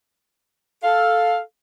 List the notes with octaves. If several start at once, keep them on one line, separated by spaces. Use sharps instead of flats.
A4 F5